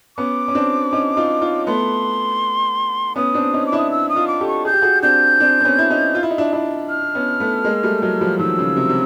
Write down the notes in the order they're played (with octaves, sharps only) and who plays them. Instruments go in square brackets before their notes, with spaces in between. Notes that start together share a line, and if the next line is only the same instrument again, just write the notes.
[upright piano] B3 C#4 [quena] D6
[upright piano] C#4
C4 D4
C#4 D#4
D#4 F4
D#4 F4
[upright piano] A3 B3 [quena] C6
[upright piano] B3 C#4 [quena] D#6
[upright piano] C4 D4
C#4 D#4
[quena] D6
[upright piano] D4 E4
[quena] D#6
E6
D#6
[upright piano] D#4 F4
[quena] D6
[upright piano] G4 A4
[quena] C#6
[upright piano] G#4 [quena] G6
[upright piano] G4
F#4 G#4
[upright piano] C4 D4 [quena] G6
[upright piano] C4 D4
C4
B3 C#4
E4
C#4 D#4
F4
E4
D#4
D4 E4
D4 E4
[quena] F6
[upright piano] B3 C#4
A3 B3
G#3 A#3
G3 A3
F#3 G#3
F3 G3
[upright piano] D#3 F3 [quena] E6
[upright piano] C#3
C3
C3